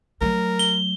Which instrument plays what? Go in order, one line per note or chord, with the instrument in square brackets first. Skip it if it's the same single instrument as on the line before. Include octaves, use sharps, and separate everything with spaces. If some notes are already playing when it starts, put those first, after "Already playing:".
[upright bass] F#3 A3 [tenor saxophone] A#4
[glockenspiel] G7